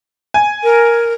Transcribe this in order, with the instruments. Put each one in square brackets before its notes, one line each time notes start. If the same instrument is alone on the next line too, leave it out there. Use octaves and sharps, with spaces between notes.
[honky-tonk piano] G#5
[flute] A#4